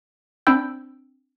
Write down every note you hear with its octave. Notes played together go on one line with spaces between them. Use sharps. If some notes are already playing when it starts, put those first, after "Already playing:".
C4 D4 G5 B5 E6 G6